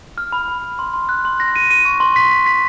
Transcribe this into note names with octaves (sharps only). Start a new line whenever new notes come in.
F6
B5
B5
B5
C6
C6
F#6
C6
A#6
D#7
D#7
C#6
C6
B6
B6
B6